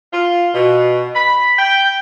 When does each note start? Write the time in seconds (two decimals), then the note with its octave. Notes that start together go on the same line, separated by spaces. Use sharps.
0.12 F4
0.53 B2
1.14 B5
1.57 G5